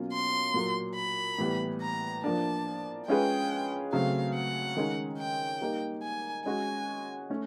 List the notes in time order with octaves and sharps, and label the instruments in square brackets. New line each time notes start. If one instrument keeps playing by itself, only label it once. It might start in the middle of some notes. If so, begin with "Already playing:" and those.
Already playing: [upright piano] B2 F#3 A#3 C#4 F4
[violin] C6
[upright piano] A#2 F#3 A#3
[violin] B5
[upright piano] A2 E3 G3 B3
[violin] A#5
[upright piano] F3 A#3 D4 [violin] A5
[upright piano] G#3 C#4 F4 G#4 B4 [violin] G5
[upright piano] C#3 F#3 A3 C4 [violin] F5
[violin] F#5
[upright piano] D#3 G#3 C#4
[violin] G5
[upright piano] G3 A#3 D#4
[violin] G#5
[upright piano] G#3 C#4 F#4 [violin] G#5
[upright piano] A3 C#4